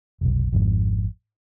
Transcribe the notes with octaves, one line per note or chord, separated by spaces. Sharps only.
F1 B1
G#1 F2 G#2